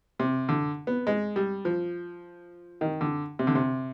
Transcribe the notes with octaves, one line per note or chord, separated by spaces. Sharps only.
C3
D3
B3
G#3
G3
F3
D#3
D3
C3
D3
C3